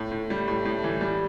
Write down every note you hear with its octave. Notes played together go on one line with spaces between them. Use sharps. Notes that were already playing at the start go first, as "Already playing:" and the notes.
Already playing: A2
A2
G3
A2
A2
E3
G3